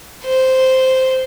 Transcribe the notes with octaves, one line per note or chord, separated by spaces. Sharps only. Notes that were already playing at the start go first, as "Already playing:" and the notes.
C5